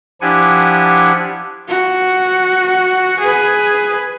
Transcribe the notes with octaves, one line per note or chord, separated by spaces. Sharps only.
F3 D4 E4 G4 F#5 G#5
F#4
G#4 B4